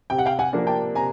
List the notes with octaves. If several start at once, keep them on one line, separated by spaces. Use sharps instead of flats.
C3 G5
F#5
F5 G5
F#5 G#5
F3 A#3 D4
G5 A5
C3 G#5 A#5